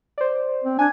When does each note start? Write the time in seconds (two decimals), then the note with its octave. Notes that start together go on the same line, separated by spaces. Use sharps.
0.18 C5 D5
0.64 C4
0.79 D4 G#5 G#6